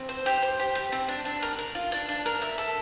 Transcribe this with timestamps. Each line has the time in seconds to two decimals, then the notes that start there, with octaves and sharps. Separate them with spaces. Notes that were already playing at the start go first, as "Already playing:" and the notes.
Already playing: C4
0.09 C5
0.26 G4
0.42 C5
0.60 G4
0.75 G4
0.92 C4
1.08 D4
1.25 D4
1.42 A#4
1.59 A#4
1.75 F4
1.92 D4
2.09 D4
2.26 A#4
2.42 E5
2.58 A4